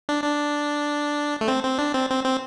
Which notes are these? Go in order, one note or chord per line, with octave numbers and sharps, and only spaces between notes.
D4
D4
A3
C4
C4
D4
C4
C4
C4